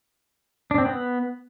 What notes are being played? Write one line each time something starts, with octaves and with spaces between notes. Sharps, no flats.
D4
C4
B3